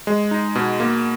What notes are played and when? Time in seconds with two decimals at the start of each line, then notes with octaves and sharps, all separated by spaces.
0.07 G#3
0.31 D#4
0.55 B2
0.80 A#3